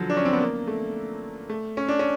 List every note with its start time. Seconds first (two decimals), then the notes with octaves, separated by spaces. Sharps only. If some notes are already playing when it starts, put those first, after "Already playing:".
Already playing: D3 F3 F#3
0.10 D4
0.17 C#4
0.25 C4
0.33 B3
0.40 A#3
0.67 A3
1.50 A3
1.77 C#4
1.88 D4
1.99 C#4